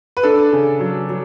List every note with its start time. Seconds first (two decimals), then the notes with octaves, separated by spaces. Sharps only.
0.17 B4
0.23 D4 A4
0.53 C#3
0.80 F#3
1.09 F#3